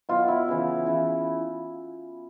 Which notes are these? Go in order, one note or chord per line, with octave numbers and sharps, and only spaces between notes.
B2 F#3 F4
E4
C#3 E3
C#3 E3